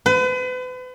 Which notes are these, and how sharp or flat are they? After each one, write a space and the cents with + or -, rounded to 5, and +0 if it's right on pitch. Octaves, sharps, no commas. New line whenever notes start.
B4 +40